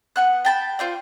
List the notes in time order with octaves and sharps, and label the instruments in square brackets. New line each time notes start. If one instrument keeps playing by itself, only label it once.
[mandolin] B3 F#5 F#6
G5 A5 B5
F4 C5 D5